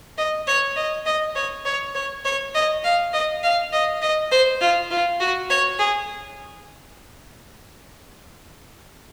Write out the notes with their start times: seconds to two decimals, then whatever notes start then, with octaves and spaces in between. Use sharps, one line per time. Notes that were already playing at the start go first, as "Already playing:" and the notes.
0.18 D#5
0.47 C#5
0.76 D#5
1.06 D#5
1.36 C#5
1.65 C#5
1.95 C#5
2.25 C#5
2.55 D#5
2.84 F5
3.13 D#5
3.43 F5
3.73 D#5
4.02 D#5
4.31 C5
4.61 F4
4.91 F4
5.20 F#4
5.50 C#5
5.79 G#4